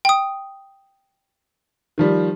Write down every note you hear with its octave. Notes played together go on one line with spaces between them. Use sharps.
G5 D#6
D#3 F3 G3